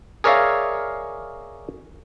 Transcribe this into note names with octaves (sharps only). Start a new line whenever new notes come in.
G#4 A#4 C#5 D5 E5 F5